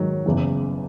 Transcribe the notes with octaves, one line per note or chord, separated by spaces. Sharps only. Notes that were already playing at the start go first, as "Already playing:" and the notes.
Already playing: G#2 D#3 F#3
F#1 E2 C#3 E3 B3